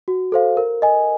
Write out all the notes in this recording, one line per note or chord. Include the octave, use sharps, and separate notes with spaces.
F#4
A4 C5 F5
A#4
D#5 G#5